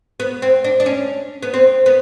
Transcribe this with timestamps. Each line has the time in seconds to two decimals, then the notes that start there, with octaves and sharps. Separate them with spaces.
0.20 B3
0.42 C4
0.64 D4
0.80 D4
0.86 C#4
1.42 B3
1.54 C4
1.86 B3